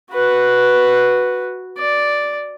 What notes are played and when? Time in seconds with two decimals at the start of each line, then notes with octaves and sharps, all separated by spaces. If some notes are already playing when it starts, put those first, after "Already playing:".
0.12 F#4 B4
1.78 D5